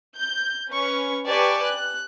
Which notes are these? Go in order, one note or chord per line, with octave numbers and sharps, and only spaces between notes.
G6
C#4 B4 C#6
G4 B4 D5 G#5 A5 C#6
F#6